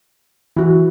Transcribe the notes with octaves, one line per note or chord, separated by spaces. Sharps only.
E3 E4 F#4